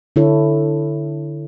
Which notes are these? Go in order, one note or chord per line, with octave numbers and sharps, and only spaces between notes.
D3 E4 A4 C#5